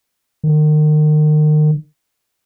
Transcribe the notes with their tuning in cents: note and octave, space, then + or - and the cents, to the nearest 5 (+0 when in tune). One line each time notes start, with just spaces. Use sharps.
D#3 -35